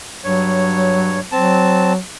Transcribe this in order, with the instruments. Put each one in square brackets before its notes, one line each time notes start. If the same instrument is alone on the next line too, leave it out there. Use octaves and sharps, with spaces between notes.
[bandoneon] G2 C#5 [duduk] F#3
[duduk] F#3 [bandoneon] C4 A5